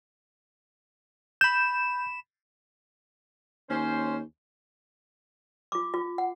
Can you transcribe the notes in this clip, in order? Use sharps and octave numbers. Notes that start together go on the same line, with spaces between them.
B5 G6 E7
D#2 C#4 C5
F4 D6
F4
F#5